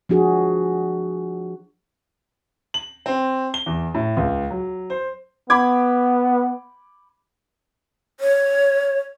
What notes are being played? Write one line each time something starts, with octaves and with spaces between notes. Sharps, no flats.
F3 D4 F#4 G#4
F#7
C4
G7
E2
A2
C#2
F#3
C5
B3 B5 D6 G#6
C#5